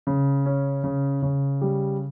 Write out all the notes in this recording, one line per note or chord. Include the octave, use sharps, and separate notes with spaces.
C#3
C#4
C#3
C#3
G3